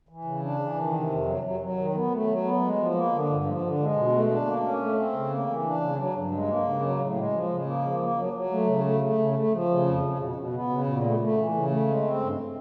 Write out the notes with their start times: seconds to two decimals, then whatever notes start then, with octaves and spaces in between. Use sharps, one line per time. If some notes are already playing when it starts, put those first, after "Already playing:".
0.09 E3
0.25 C#3
0.42 D4
0.59 E3
0.76 D#3
0.93 C3
1.10 F2
1.26 F#3
1.43 F#3
1.60 F#3
1.77 D#3
1.94 B3
2.11 A3
2.27 F#3
2.44 B3
2.62 G#3
2.78 F3
2.95 A#3
3.12 D3
3.29 G2
3.45 F3
3.62 D3
3.79 G#3
3.96 B2
4.12 A3
4.29 D4
4.46 A#3
4.64 C#4
4.80 A3
4.96 C4
5.13 C#3
5.30 A#3
5.47 E3
5.64 D4
5.80 C#3
5.97 F#3
6.15 G2
6.31 G#3
6.48 A#3
6.65 C#3
6.81 F#3
6.99 A2
7.15 G#3
7.33 F3
7.49 C#3
7.66 A#3
7.84 F3
8.00 A#3
8.16 F#3
8.33 F#3
8.50 A3
8.67 C#3
8.84 A3
9.01 A3
9.18 C#3
9.35 A3
9.52 F3
9.69 C#3
9.85 F2
10.03 C#3
10.19 B2
10.36 B2
10.53 B3
10.70 C#3
10.87 A#2
11.03 A3
11.19 A3
11.37 E3
11.54 C#3
11.70 A3
11.88 G#3
12.04 C4
12.22 G2